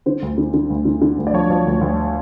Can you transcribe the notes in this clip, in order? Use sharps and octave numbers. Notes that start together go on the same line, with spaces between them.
D3 C5
D2
D3
D3
D2
D3
D3
D2
D5
F3 C#5
F3
D2
D2